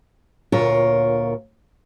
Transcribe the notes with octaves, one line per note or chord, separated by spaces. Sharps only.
D2 A#2 F4 A#4 C#5